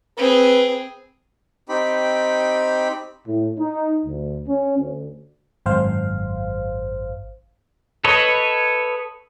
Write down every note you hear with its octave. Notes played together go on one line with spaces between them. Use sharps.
C4 G#4 B4
C4 D#4 G4 B5
A2
D#4
D2
C#4
D2
G#1 F#2 C5 F5
A4 B4 C#5 D#5